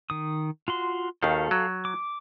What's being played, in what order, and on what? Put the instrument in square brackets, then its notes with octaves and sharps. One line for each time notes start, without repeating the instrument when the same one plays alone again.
[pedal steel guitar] D#3 D#6
F4 F#4 C6
[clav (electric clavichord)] D#2 D#3 [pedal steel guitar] F#4 A4 F5
[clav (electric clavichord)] F#3
[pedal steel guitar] D6